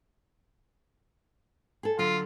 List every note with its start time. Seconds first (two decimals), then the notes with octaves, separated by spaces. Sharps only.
1.83 G#4 A4
1.99 D3 F#3 F4